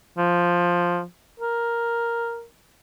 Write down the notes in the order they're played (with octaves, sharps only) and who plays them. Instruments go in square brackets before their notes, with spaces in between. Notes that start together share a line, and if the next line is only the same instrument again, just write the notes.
[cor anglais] F3
A#4